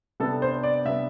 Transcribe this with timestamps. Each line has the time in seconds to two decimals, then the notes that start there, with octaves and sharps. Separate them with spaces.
0.20 C3 G3 B3 D4 A4
0.42 C5
0.63 D5
0.85 C3 G3 B3 D4 E5